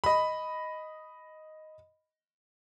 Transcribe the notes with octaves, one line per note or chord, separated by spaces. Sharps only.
D#5 B5